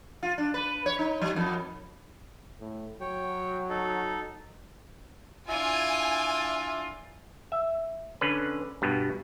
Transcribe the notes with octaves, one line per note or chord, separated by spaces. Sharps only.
F4
D4
B4
C#5
D#4
F#3
F2
A2
F#3 C#5 G5
D#4 A4
D4 E4 F4 G#5
E5
D3 C#4 B4
G2 B2 B3